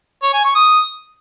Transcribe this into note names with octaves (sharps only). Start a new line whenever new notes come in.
C#5
G#5
C#6
D#6